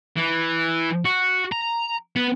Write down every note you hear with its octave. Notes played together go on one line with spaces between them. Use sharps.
E3
F#4
A#5
B3